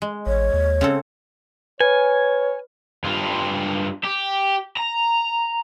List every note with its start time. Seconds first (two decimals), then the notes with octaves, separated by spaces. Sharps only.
0.02 G#3
0.26 A1 C#5
0.54 D#2
0.81 C#3 C4 A4
1.81 B4 C#5 G#5
3.04 G2 F4
4.05 G4
4.77 A#5